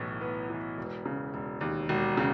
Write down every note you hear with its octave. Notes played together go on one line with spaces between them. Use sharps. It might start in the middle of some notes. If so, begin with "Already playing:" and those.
Already playing: B1 A2 E3
B3
E3
E1
C#3
E1
D#2
E1
C#3